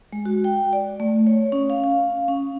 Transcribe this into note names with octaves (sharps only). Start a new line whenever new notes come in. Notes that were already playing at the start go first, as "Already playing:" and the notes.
G#3
F#4
G5
D5
A3
C#5
C#4
F5
F5
C#4